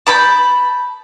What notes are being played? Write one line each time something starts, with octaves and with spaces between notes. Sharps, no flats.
A5 B5 G6